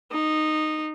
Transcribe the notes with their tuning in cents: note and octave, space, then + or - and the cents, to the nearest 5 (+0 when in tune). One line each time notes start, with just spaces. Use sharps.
D#4 -10